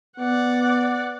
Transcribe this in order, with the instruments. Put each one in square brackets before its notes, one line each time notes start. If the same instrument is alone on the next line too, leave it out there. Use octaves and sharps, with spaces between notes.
[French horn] B3 [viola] D5 F#5